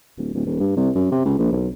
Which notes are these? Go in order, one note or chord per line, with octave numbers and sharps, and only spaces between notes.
D1
D1
D#1
G2
C2
F#2
C3
C#2
A#1
B1